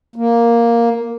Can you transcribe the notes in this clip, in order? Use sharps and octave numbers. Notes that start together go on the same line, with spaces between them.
A#3